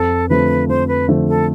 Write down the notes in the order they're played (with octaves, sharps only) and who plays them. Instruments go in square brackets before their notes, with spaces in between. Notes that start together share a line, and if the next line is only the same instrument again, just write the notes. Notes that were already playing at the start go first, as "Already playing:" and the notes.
Already playing: [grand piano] F2 [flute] A4
[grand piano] D3 F3 A3 C4 [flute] B4
[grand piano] F2 [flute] C5
[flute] B4
[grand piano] D3 F3 A3 C4
[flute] A4